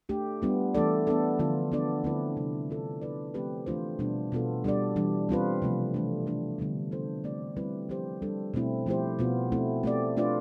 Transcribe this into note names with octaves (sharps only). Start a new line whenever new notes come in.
A3 D4 G4
G3 B3 D4 F4
E3 A3 D4 A4 D5
B3 D4 A4
D3 F3 B3 F4
B3 D4 A4 D5
D3 A3 C4 E4 B4
C3 G3 B3
B3 F4 A4
B3 E4 B4 D5
F3 A3 C4 G4 B4
E3 A3 D4 F4 C5
B2 G3 B3 D4
B2 B3 F4 A4
G3 D4 A4 D5
E3 G3 D4
G3 C4 F4 B4
C3 F3 A3
E3 A3 D4
E3 A3 D4 G4
D3 G3 B3 D4
B3 F4 A4 C5
A3 C4 G4 D5
G3 C4 E4 B4
F3 C4 G4 C5
G3 D4 A4
B2 A3 C4 E4
F3 A3 E4 G4 C5
B2 B3 F4
A3 C4 E4
A3 C4 G4 D5
A3 D4 F4 B4 D5